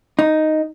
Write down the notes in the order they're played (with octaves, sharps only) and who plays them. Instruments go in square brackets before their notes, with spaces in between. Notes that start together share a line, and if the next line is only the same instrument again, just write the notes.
[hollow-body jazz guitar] D#4